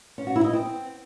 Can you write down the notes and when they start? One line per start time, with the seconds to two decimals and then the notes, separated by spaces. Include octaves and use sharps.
0.18 C#4
0.27 F#4
0.36 E4
0.44 D#5
0.53 C4